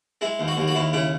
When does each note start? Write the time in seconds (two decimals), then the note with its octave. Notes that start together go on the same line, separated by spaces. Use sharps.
0.21 G#3 E4
0.39 D#2
0.48 F#4
0.57 D#2
0.68 F#4
0.75 D#2 E4
0.93 C#3 E4